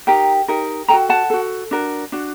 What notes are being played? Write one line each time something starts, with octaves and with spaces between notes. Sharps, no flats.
D#4 G4 A#4 G5 A#5
D#4 G4 A#4
F#4 A4 G5 A#5
F#5 A5
F#4 A4
D4 F#4 A#4
D4 F#4